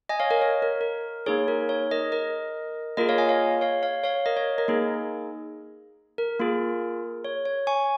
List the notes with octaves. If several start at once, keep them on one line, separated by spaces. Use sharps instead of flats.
D#5 G#5
C#5 F5
A#4 D#5
C#5
A#4
A#4
A#3 D#4 G#4 C#5
A#4
C#5
A#4 D#5
A#4 D#5
A#3 F4 G#4 A#4 D#5
C#5 F5
D#5 G#5
C#5 F5
C#5 F5
C#5 F5
C#5 F5
A#4 D#5
C#5
A#4 D#5
A#3 D#4 G#4
A#4
A#3 F4 G#4
C#5
C#5
G#5 C#6